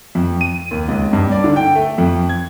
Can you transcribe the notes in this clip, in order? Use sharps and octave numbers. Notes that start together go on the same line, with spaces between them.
F2
D#7
D#2
C#2
G2
D5
D3
G5
A3
F2
G#6